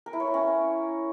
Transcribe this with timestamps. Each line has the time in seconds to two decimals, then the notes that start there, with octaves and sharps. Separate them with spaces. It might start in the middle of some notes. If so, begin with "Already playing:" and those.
0.06 A#4
0.13 E4
0.20 C#5
0.27 A#4
0.34 C#4